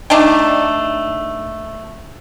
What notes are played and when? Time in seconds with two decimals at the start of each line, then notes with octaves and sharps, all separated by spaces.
0.10 A3 D4 D#4 G5